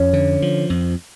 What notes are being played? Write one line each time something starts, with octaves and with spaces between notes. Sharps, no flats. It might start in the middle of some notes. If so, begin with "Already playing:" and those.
Already playing: F2 C#4
D3
F3
F2